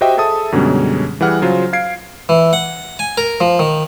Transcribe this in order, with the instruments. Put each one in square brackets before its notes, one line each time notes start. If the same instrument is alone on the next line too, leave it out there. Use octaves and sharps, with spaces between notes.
[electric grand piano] F#4 G4 C5 D#5 E5 G5
G#4 A4 E5 A5 D#6
F#2 B2 D3 G3 G#3 C#4
E3 G3 G#4 F#5 F6
C#3 F#3 F4 C5
F5 G#6 C7 D7
[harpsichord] E3
F#5
G#5
A#4
F3
D#3